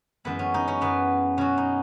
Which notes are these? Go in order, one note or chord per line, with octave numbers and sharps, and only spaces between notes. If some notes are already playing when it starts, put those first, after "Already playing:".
F#2 E3 G#3 B3
C#4
D#4
C#4
F#2 E3 G#3 B3
B2 F#3 C#4
D#4